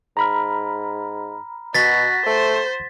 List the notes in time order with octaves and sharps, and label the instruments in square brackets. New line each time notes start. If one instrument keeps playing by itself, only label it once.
[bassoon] G#2 [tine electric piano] A#5 B5 F6
[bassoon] B2 [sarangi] F#4 [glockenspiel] A6 B6
[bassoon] A3 [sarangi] C5